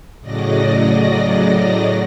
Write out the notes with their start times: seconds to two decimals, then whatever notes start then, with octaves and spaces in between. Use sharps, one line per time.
0.21 A2 C#3 F#3 D5 D#5 A#6